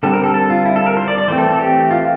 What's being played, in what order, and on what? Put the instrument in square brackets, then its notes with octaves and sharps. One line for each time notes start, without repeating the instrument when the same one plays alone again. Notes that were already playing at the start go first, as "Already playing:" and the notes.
[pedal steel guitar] D3 G3 C4 A4
A#4
A4
A4
F4
E4
A4
A#4
C5
D5
D5
E3 A3 C4 C5
A4
A4
G4
F4